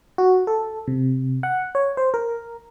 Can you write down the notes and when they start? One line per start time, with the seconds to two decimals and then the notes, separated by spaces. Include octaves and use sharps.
0.18 F#4
0.47 A4
0.87 C3
1.43 F#5
1.75 C#5
1.97 C5
2.14 A#4